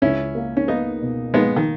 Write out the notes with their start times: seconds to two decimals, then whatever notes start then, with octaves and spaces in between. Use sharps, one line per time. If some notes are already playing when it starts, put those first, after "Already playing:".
0.02 C#2 C#4 E4
0.35 A#3
0.57 C#4
0.68 A#3 B3 D#4
1.01 B2
1.34 G#3 A#3 B3
1.56 D#3